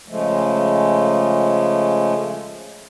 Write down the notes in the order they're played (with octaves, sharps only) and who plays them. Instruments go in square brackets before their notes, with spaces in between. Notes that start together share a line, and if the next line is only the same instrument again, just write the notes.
[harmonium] C#3 F3 G#3 A3